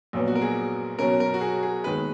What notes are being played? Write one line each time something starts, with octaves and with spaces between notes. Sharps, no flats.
A#1 A#2 F#3 B3
F#4
A#4
G#4
B2 F#3 C#4 A#4
A#4
F#4
G#4
G#4
D#2 D#3 G#3 B3 B4